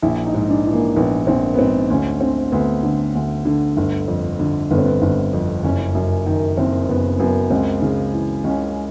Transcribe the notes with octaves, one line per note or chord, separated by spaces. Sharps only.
A#1 E4
D#4
G#2
D4
E3
A#3
A#1 B3
A#1 C4
B3
G#2 C4
D2 C#4
D3 C4
D2 B3
D3
D2
D3
G1
F2
D3
G1 B3
C4
B3
G1
F2
F#1 C#4
F#2
D#3
F#1 C4
F#1 B3
F#2 B3
C#2 C4
C#3
E3
C#2 C#4